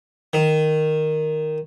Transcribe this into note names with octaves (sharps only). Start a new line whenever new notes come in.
D#3